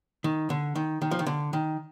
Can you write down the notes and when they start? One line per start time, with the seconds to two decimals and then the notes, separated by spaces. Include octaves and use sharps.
0.24 D#3
0.50 D3
0.76 D#3
1.02 D#3
1.11 F3
1.19 D#3
1.26 D3
1.53 D#3